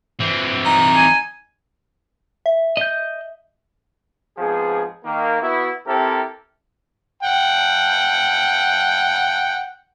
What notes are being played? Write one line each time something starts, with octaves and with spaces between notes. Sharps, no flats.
E3 C4
D#4
G#5
E5
D#5 G6
G#2 F3 B3 C4 G#4
D#3 A#3
B3 E4 F#4
C3 C4 E4 G4 A4 A#4
F#5 G5